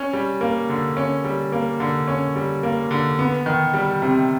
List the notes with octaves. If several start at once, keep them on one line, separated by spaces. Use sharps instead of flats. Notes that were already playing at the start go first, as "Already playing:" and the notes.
Already playing: C#4
G3
A#3
D3
C#4
G3
A#3
D3
C#4
G3
A#3
D3
B3
D#3
G3
C3